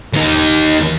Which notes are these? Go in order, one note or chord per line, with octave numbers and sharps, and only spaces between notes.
D#2 D#4